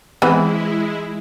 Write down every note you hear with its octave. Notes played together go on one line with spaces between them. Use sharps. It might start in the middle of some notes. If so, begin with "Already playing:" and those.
E3 G#3 B3 C4 E4 B4